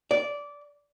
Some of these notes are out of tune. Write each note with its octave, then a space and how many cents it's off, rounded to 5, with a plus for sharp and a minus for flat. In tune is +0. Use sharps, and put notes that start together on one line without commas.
D5 -15